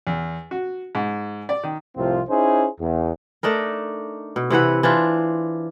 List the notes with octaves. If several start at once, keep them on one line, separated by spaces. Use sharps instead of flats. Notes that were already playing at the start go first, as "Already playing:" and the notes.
E2
F#4
G#2
D5
D#3
C2 A2 C3 F3 C4 F4
C#4 D#4 E4 G#4 C5
E2
A3 D4 D#4 A#4
B2
C3 E3 B4 F#5
E3 D4 F4 C5